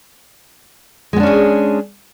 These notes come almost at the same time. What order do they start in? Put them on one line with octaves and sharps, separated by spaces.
G#3 B3 D4 C#4 G#4